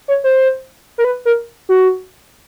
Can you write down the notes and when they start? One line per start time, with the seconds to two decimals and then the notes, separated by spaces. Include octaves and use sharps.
0.08 C#5
0.24 C5
0.98 A#4
1.04 B4
1.25 A#4
1.69 F#4